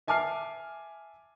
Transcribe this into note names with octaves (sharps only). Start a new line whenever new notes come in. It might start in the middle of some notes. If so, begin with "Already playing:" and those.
E5 G#5 A5 D6 F6 C7